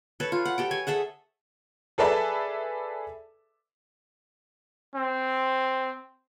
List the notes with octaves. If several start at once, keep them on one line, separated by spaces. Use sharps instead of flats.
A4 B4 C#5
F4
F#5
G4 A4 G5
C#5 G#5
G#4 A4 E5 F#5
G#4 A4 B4 D5 E5 A5
C4